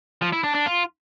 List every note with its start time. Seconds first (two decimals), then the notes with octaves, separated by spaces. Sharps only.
0.22 F3
0.33 E4
0.44 D4
0.55 D4
0.66 F4